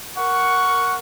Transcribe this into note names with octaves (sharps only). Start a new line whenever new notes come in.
A#4 F#5 C#6